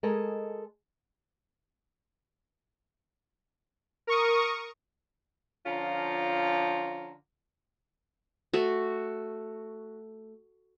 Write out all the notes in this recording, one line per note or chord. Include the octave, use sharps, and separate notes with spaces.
G#3 A4 A#4 D#5 G#5
A#4 C#6 D#6
D3 F3 C#4 F4 A#5
A3 F#4